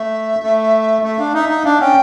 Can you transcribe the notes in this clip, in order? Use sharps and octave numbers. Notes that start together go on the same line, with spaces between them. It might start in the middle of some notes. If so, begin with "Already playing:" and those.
Already playing: A3 E5
A3
A3 E5
D4 F5
D#4 E5
D#4
D4 F5
C#4 G5